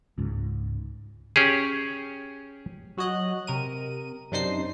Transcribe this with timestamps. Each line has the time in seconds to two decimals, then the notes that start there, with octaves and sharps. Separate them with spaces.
0.18 C#2 G#2
1.36 C#4 G4 G#4
2.97 F#3 F#4 C#5 D#5 F#6
3.47 C3 A#4 D#7
4.31 F#2 C3 D4 D#4 C5 C7